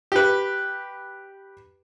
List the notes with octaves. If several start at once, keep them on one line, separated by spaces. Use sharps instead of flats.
G4 B4